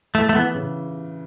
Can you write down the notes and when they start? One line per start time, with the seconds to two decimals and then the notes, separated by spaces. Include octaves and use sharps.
0.14 E3 A3
0.29 A3
0.35 E3 B3
0.55 C#3